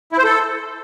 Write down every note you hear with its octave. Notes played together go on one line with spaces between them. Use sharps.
E4
C5
A4